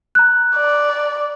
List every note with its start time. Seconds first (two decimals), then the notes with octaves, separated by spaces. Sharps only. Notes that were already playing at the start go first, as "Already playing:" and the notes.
0.15 A#5 F#6
0.56 D5